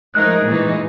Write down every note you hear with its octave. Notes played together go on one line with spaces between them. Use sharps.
F3 G#3 A3 D#4 G#4 A#4 F#6
A#2 E3 D#4